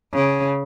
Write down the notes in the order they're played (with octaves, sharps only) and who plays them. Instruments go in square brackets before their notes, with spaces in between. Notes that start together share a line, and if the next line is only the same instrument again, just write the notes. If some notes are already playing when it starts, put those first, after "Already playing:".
[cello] C#3